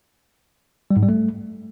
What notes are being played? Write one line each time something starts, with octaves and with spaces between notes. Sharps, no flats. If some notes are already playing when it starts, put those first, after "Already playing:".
G3
G#2
G3
A3